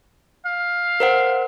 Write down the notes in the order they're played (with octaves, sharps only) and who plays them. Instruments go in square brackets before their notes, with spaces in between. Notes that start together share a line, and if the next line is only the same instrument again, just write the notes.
[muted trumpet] F5
[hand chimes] A#4 C5 F#5